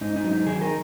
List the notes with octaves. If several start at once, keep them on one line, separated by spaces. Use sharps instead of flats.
G#2 D#4
D#4
F#3
D#4
D#3 G#4
A#4